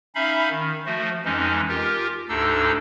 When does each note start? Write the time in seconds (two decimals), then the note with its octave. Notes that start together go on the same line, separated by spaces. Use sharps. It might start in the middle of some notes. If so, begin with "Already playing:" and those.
0.15 C#4 D#4 E5 F5 B5
0.50 D#3
0.86 F3 A3 F#4
1.25 F2 E3 G#3 C#4 D#4
1.69 F4 G4 A#4
2.29 D2 G#2 D4 D#4 A4 E6